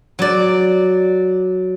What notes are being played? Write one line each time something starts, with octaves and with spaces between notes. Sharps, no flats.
F#3 D5